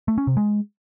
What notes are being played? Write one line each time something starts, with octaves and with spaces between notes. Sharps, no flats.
A3
C#4
C3
G#3